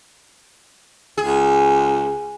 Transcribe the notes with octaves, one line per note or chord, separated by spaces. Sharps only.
C#2 G#4